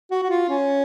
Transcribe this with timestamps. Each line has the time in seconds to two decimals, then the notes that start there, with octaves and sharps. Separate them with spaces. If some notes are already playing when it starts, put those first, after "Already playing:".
0.11 F#4
0.23 F#4
0.30 F4
0.49 C#4